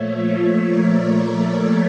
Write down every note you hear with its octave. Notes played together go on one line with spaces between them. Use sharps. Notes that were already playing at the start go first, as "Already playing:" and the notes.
Already playing: A#2 F3 A3 C#5 E5
C#5 E5
A#4 D5
A#4 D5
A4 C#5
G4 A#4